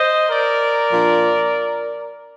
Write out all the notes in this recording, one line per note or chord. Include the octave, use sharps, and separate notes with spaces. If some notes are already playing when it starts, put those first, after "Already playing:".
Already playing: C5 D#5
A#4 D5
A#2 F3 A#3 D4